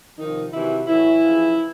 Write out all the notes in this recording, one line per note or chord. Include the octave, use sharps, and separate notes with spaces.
C3 D#3 F3 D#4
C3 D#3 E3 F#3 E4
A2 E3 F#3 E4
C#3 F3